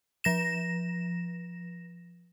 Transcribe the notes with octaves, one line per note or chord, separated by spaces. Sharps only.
F3 A#6 E7